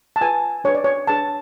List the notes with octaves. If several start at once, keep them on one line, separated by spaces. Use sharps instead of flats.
A5
F4 G#4 B4 G#5
D4 G#4 B4 C#5
D5
C#5
D4 G#4 B4 A5